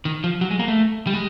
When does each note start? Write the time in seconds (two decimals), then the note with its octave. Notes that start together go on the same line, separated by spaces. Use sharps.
0.05 D#3
0.24 F3
0.41 F#3
0.51 G#3
0.59 A#3
0.68 A3
1.07 G3
1.13 G#3